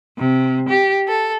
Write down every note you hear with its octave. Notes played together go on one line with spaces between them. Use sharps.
C3
G4
A4